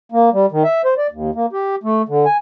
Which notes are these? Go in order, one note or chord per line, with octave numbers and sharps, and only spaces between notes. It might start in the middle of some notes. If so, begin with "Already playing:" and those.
A#3
G3
D#3
E5
C5
D5
D#2
A#3
G4
A3
D3
G#5